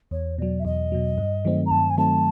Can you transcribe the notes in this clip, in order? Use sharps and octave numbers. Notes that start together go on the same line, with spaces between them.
E2 C#5
B2 F#3 D5
E5
E2 D#5
B2 F#3
G2
D#3 F#3 A3 C4
A#5
G2 A5
G#5
D#3 F#3 A3 C4 A5